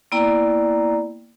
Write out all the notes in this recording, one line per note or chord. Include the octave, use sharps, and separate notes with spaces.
A#3 B3 E4 D5 G5 A#5